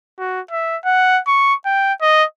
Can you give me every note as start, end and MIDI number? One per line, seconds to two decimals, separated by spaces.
0.19 0.40 66
0.51 0.77 76
0.85 1.20 78
1.27 1.54 85
1.65 1.93 79
2.01 2.24 75